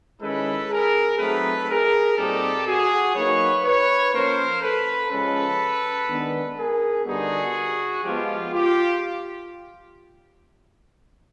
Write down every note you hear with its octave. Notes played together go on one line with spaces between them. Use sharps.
D#3 G#3 C#4 E4 A4 B4
G#4 A#4
F#3 A3 C4 D#4 A4 B4
G#4 A#4
A#2 G3 C4 D#4 G4 A4
F#4 G#4
F#3 A#3 D#4 B4 C#5
B4 C#5
F3 A#3 C#4 A#4 C5
A4 B4
C#3 F3 G#3 C#4 A4 B4
D#3 G#3 B3 D4
G#4 A#4
D3 G3 B3 D#4 F#4 G#4
F3 G#3 B3 F4 G4
F4 G4